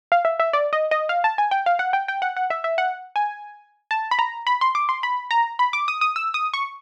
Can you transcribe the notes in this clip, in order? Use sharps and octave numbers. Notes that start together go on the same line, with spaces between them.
F5
E5
E5
D5
D#5
D#5
F5
A5
G#5
G5
F5
F#5
G5
G5
F#5
F#5
E5
E5
F#5
G#5
A5
B5
A#5
B5
C6
D6
C6
B5
A#5
B5
D6
D#6
D#6
E6
D#6
C#6